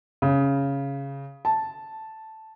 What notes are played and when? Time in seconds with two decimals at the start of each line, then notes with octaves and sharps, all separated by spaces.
0.22 C#3
1.45 A5